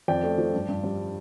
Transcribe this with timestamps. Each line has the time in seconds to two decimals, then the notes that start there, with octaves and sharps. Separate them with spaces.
0.08 F2 D5 G5
0.23 A3
0.38 F3
0.54 G2
0.69 G2
0.84 G3